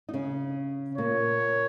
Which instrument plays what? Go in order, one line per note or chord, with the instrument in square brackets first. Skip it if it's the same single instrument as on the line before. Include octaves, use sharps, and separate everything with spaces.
[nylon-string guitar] D#4
C#3 C#4
[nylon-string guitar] A#2 A#3 [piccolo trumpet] C#5